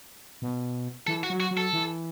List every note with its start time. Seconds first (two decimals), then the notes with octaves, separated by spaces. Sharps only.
0.42 B2
1.07 E3 A4
1.23 F#4
1.30 F#3
1.40 F#4
1.51 F#3
1.57 A4
1.73 E3